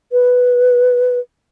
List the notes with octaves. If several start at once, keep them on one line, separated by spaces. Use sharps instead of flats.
B4